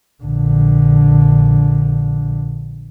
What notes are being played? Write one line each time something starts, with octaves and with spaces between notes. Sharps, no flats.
A#1 D3